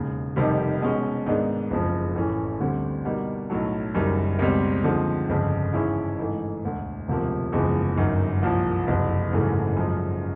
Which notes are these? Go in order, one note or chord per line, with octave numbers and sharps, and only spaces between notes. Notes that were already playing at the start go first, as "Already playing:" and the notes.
Already playing: E1 D#2 C#3
F1 F2 C3 D#3 G3
B2 G#3 C#4
G#2 D#3 G#3 B3 D4
F#1 F2 C#3 F3
A1 A2 E3 A3 C#4
D2 D3 G3 C4
B2 G3 A#3 D#4
B1 A2 F#3
F#1 F#2 D#3 G3
C#2 B2 G3 C4
D#2 D3 F3 G#3 C4
G1 F2 C#3
G#2 E3 G#3 C#4 E4
G#2 E3 A3
E1 D2 D3
E1 D2 C3 F3 A#3
F#1 E2 C#3 F3 G#3
G1 F#2 D#3
C2 A#2 F3
F#1 F2 C3
G#1 F#2 C#3 E3 A3
F#2 C#3 F3 G#3